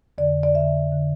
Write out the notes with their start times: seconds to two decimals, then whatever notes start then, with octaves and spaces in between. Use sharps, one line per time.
0.18 F2 D3 D5
0.43 D5
0.55 F2 D3 E5
0.92 D3